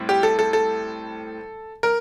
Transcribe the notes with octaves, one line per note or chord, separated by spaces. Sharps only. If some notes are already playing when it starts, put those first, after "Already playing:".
Already playing: A2 G3 C4 E4
G4
A4
A4
A4
A#4